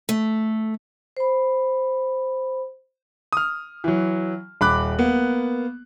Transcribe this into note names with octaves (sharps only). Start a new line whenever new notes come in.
A3
C5 B5
D#6 F6
E3 F#3
D#1 B5 D6 F#6
A#3 B3